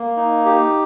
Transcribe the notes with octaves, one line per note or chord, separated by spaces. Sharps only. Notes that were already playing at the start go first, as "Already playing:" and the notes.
Already playing: A#3
D#4
G4